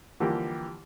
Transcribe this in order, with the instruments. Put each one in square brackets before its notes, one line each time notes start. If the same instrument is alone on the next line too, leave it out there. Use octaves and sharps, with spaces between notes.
[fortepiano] D3 E3 F3 G3 A#3 G4